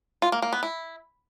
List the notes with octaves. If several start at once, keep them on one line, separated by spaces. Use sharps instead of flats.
F4
A#3
A#3
B3
E4